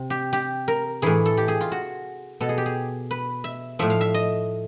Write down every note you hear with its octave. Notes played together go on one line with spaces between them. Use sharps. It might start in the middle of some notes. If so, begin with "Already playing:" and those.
Already playing: C3
G4
G4
A#4
A2 E3 G#4
A4
G4
G#4
F4
F#4
B2 A4
G#4
G4
G#4
B4
E5
A2 F3 E5
F5
E5
D#5